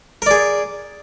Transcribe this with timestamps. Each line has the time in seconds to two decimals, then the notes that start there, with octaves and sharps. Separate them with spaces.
0.22 A#4
0.26 D5
0.31 G#4